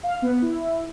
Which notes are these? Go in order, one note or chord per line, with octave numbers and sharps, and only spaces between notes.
F5
B3
E4